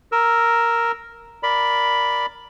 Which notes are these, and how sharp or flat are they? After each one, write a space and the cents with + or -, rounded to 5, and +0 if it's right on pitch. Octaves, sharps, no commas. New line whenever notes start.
A#4 +0 E6 +0
A#4 +5 D5 +0 B5 +0